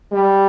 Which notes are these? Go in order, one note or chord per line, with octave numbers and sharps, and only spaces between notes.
G3